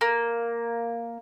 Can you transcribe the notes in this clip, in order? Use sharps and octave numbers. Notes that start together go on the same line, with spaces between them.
A#3